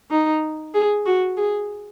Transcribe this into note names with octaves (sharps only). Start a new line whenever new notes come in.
D#4
G#4
F#4
G#4